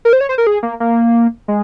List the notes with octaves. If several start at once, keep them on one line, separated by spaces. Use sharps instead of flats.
A#4
C5
C#5
C5
A#4
G#4
A#3
A#3
G#3